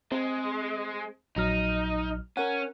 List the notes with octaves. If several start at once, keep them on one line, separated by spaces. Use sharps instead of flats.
G#3 C4
A#1 F#3 D#4 F6
C#4 A#4 F#5